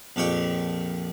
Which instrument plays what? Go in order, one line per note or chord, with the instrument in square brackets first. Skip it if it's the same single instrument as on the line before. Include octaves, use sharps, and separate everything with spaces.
[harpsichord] A#1 F2 G4 C#6